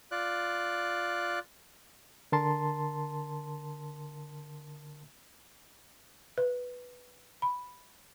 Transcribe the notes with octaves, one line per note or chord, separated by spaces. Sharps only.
F4 D5 F#6
D3 A#4 A5 C6
B4
B5